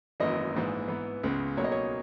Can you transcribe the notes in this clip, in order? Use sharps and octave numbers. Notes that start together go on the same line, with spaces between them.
G#1 F#2 E3 A#3 D#5
A#1 G#2 E3
G#2 E3 B3
C#2 C#3 G#3 B3
B1 B2 F#3 A#3 C#5
D#5
C#5